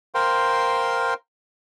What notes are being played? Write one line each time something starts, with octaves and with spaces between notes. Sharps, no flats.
A#4 C5 F5 G5 C6